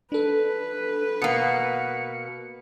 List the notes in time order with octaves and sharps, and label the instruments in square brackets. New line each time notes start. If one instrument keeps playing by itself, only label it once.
[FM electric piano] D4 A4 [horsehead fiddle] B4
[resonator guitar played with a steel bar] B2 A#3 [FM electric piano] C#7